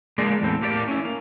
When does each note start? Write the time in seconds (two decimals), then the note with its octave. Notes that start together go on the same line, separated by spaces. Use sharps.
0.18 G#3 A#3 D4 G#4 D5
0.41 E2 A2 C4
0.61 A2 A#3 G4 A4 D5
0.88 C#4 E4
1.05 A#3